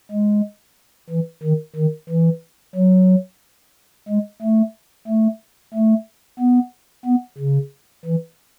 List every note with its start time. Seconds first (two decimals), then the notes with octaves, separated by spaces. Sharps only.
0.11 G#3
1.10 E3
1.43 D#3
1.76 D#3
2.09 E3
2.75 F#3
4.08 G#3
4.42 A3
5.07 A3
5.74 A3
6.39 B3
7.05 B3
7.38 C#3
8.05 E3